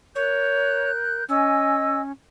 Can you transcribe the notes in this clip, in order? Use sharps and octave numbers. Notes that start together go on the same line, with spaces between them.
A#4 C#5 F#6 G6
C#4 D#5 G#5 E6